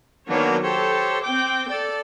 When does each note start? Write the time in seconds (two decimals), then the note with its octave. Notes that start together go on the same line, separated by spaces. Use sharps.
0.29 D#3 F#3 A#3 B3 D4 C#5
0.63 G4 A4 C5 C#5
1.23 C4 G5 D6
1.70 A4 D5